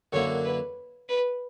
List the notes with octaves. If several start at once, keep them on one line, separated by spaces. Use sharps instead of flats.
F#2 D3 F#3 A#3 E4 C#5
B4
B4